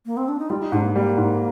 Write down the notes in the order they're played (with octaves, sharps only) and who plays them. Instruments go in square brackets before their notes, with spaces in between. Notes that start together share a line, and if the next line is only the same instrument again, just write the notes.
[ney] A#3
C4
D4
D#4
[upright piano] G3 [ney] F4
[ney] D#4
[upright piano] G#2 [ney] D4
[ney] A#3
[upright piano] G3 [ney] A#3
[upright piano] G#2